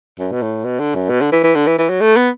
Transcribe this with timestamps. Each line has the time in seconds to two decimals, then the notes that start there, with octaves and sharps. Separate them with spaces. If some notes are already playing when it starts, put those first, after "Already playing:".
0.19 F#2
0.32 B2
0.42 A2
0.64 B2
0.79 D3
0.95 F#2
1.10 B2
1.21 D3
1.32 E3
1.44 E3
1.55 D3
1.67 E3
1.78 E3
1.89 F#3
2.01 A3
2.16 B3